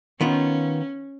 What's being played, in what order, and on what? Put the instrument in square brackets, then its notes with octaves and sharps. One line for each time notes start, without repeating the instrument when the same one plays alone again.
[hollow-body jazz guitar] D#3 B3 F4 [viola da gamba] C#4